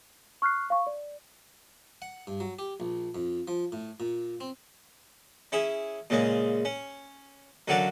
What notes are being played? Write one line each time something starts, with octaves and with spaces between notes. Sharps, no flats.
C#6 F6 F#6 C7
F5 C#6
D5
F#5
G2
F#3
G4
A#1
F2
F3
A2
A#2
C4
C#4 E4 G#4
A#2 C#3 G#3
C#4
F#2 D3 F#3 F#4 D5 F5